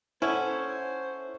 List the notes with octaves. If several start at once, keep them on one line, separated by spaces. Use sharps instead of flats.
C#4 E4 A4 C5 C#5 F#5